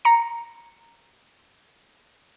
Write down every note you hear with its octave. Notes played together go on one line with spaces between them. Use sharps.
A#5 C#7